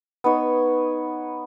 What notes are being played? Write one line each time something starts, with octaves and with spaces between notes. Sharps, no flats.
B3 D#4 C#5